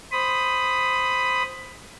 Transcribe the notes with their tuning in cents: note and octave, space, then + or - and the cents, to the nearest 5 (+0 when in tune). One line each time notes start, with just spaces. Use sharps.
C5 +0 B5 +10 D#6 +0